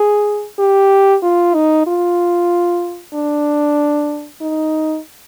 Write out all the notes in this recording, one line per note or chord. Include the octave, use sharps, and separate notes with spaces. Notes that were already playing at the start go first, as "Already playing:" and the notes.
Already playing: G#4
G4
F4
D#4
F4
D4
D#4